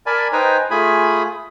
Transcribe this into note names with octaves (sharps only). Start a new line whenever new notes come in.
A#4 D5 G#5 A5 B5
D#4 B4 C5 G5 G#5 A#5
A3 F4 G#4 G#5 B5